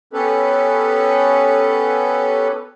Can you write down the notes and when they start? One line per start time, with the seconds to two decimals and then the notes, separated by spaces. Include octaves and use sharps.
0.13 B3 C#4 G4 A4 B4